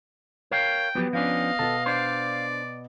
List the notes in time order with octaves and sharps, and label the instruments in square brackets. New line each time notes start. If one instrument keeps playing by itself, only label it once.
[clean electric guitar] A#4 C#5 F5 [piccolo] G5
[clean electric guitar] F3 F#3 G4 [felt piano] B3
[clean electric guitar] F3 C#4 D4 [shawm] D#5 [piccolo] F5
[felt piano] B2 B3 [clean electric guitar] A4
[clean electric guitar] D4 C5 [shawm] D5